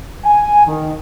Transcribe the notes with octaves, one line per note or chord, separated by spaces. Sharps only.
G#5
D#3